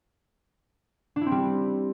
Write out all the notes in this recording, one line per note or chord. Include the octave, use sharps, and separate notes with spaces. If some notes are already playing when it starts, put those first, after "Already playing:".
D4
E4
C4
G3